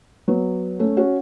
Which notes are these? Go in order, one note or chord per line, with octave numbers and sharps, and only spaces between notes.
F#3 B3
A3 C#4
C#4 F#4